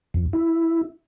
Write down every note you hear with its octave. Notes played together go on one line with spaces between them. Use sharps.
F2
E4